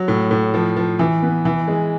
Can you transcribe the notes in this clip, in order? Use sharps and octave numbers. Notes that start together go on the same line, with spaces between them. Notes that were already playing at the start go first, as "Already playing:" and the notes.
Already playing: F#3
A2
A2
F3
F3
E3
B3
E3
G#3